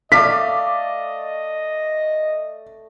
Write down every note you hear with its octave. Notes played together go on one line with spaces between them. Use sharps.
A3 D5 D#5 F5 D6 B6